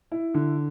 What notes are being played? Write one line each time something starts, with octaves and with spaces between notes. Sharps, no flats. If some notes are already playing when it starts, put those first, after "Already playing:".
E4
D3